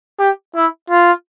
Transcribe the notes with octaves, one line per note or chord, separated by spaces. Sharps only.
G4
E4
F4